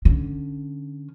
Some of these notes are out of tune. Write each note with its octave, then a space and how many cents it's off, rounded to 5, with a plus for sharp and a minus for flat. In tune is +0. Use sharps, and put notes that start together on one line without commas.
D3 +0 C#4 +0